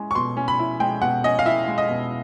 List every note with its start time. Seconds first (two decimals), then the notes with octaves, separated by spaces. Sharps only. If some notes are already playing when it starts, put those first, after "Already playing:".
Already playing: G#3 C#4 E4
0.11 C#6
0.15 B2 C6
0.37 C#4
0.48 B5
0.59 E4
0.80 G#3 G5
1.02 B2 F#5
1.24 C#4 D#5
1.39 F5
1.45 E4 E5
1.68 G#3
1.78 D#5
1.89 B2